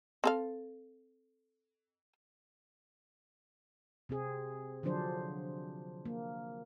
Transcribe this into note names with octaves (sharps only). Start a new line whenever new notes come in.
C4 A4 F5
C3 C4 G#4
D3 F3 F#3 D4 C5
A#3